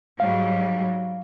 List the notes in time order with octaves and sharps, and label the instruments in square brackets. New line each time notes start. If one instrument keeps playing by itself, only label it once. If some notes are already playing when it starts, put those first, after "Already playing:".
[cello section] G#2 F#3 G3 [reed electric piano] F5